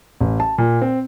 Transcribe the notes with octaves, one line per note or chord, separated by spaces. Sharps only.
A1
A5
A#2
C4